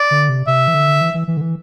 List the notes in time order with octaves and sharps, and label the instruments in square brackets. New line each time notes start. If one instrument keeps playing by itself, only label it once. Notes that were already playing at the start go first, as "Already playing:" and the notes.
Already playing: [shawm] D5
[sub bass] D3
C3
[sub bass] C3 [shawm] E5
[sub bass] E3
D3
E3
E3
E3
D3
E3